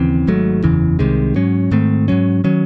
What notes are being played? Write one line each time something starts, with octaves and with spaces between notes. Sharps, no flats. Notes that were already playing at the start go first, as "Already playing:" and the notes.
Already playing: D#2 C#3 E3 C4
G#1 G#2 F#3 A3
F#1 E2 C#3 E3
C2 C3 D#3 G#3
G#2 F#3 C#4
G#2 D#3 A3 C4
G#2 F#3 C#4
D#3 F#3 C#4